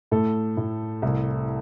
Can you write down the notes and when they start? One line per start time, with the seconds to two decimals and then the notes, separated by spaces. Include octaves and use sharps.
0.11 A2 A3 A4
0.57 A2
1.02 C2